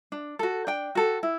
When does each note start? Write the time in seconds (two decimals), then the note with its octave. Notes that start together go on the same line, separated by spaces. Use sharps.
0.12 D4
0.39 F#4 A4
0.67 D4 G5
0.95 F#4 A4
1.23 E4